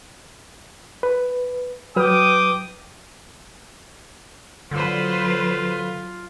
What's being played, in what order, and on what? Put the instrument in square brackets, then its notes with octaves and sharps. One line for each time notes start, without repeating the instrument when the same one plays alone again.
[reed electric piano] B4
[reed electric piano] F#3 B4 F6 [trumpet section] G5 D6 D#6
[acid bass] D3 [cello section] F#3 B4 C5 [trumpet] F4